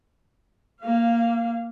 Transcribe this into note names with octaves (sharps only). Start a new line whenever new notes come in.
A#3 F5